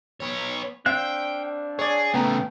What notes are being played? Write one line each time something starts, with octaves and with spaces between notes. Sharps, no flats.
B3 C#5
C4 D4 E5 F5 G5 F#6
G#4 C#5 D5
C#3 A3 B3 G5 A#5